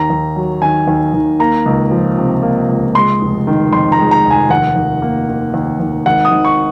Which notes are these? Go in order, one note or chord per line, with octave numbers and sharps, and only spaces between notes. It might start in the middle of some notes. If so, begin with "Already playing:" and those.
Already playing: D#2 A#5
D#2
F#3
D#3 G#5
D#2
D#2
A#3 A#5
C#2
F3
C3
A#3
C#2
G#3 C6
F1
D#3
F2 C6
A#5
G#3
A#5
F1
G#5
D#2 F#5
D#2
A#3
D#3
D#2
D#2
G#1 F#5
D#6
G#1
C#6